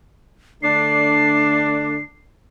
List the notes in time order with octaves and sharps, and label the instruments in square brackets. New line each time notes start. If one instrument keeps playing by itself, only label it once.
[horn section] D3 A3 D4 [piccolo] C7